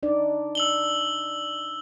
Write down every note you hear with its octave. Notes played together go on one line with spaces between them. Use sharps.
D4 D#4 D5
E6 F#7 G7